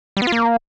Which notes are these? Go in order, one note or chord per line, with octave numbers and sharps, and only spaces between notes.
G3
B3
F4
A#3